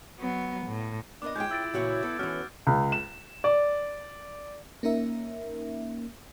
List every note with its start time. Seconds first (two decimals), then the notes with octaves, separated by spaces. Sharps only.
0.19 F#3 B3
0.67 A2
1.22 B3 D4 A#4 D#5 D6
1.36 G#3 C#4 F4 G#4 G5 G6 G#6
1.51 E4 E6 A6 D7
1.74 A#2 C#3 E3 F#4 C#5
2.03 B3 A4
2.19 E3 C#4 F#4 F6
2.67 C#2
2.92 E7
3.44 D5
4.83 A#3 C#4 D#4 A#4 E5